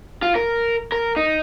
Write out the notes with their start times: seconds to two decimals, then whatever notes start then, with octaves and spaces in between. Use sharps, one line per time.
0.22 F4
0.35 A#4
0.92 A#4
1.16 D#4